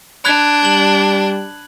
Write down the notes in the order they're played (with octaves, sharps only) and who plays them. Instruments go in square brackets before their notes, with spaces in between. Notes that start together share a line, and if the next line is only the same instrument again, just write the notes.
[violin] D4 [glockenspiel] B5 F#6 G#6
[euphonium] G3 [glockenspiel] F#7